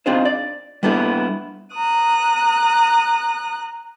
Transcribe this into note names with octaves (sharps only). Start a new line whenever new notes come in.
C4 D4 D#4 F4 G#4 C5
D5
G3 A#3 B3 D4 E4 A4
A#5 D#6 F#6